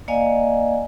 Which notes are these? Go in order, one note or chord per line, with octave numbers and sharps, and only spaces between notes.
A#3 D5 D#5 F5 G#5